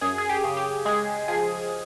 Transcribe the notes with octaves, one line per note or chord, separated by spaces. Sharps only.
F#2 G#4
G#4
G4
C#3
G4
G#3 G#4
F3 G#4